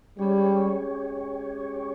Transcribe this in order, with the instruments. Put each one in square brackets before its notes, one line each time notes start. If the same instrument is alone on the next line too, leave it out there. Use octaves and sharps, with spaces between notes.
[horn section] G3 [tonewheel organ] G#3 C#4 G4 C#5